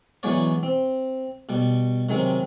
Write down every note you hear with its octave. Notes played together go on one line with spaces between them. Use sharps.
E3 F#3 G#3 B3 C#5 D5
C4
B2 G3
C3 D#3 F#3 G#3 C4